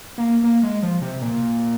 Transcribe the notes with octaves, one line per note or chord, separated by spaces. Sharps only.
A#3
A#3
G#3
F3
C3
A#2